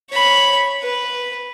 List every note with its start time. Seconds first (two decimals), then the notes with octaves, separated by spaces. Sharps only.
0.10 C#5 B5
0.83 B4